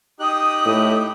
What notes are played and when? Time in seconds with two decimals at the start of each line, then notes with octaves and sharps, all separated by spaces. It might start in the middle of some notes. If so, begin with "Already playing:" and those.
0.20 D#4 G4 D#6 F#6
0.65 A2